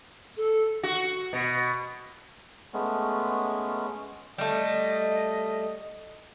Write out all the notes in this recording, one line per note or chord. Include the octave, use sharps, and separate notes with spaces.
A4
F#4
B2
G#3 A3 B3 C#4
G3 A3 D#5